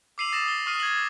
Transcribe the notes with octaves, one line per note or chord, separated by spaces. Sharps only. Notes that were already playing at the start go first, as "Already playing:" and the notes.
D6 E6 C7 D#7 F7 F#7
D#6 A6 A#6 E7 F#7
G7
C#6 D#6 F6 C7 D#7
G#6 F#7